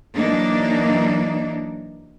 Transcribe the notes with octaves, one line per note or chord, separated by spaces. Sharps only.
E3 F#3 A#3 D4 D#4